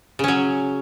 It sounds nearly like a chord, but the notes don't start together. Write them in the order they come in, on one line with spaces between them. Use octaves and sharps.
C#3 C#4 F#3